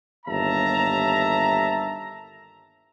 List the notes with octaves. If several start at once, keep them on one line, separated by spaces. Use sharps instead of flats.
G1 D#2 E5 A5 A#5